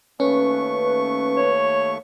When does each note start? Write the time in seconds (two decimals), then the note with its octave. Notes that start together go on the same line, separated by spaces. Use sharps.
0.20 D#2 A3 C#4 B4 C#6
1.37 C#5